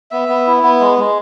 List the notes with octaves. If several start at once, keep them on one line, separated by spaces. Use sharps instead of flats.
B3 E5
B3
E4
B3
G#3
G#3